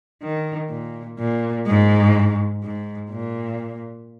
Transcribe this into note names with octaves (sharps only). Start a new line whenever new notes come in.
D#3
A#2
A#2
G#2
G#2
A#2